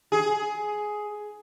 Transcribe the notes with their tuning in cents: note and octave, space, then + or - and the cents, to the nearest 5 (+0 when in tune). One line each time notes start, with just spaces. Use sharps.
G#4 +10